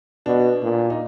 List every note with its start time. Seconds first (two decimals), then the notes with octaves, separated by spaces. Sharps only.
0.26 B2 D4
0.63 A#2
0.90 D#4